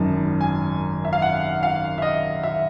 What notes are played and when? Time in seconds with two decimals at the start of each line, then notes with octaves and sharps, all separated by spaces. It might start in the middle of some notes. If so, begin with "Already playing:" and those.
Already playing: G#1 F#2 D#3 A5
0.41 G#5
1.05 E5
1.13 F5
1.22 F#5
1.63 F5
1.98 E5
2.02 D#5
2.43 E5